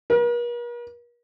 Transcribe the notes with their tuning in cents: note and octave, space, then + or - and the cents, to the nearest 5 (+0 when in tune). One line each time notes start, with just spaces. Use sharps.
A#4 +45